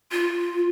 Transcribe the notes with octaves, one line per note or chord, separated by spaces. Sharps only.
F4